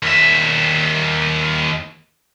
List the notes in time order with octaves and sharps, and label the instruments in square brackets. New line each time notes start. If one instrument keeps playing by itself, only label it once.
[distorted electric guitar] D#2 E5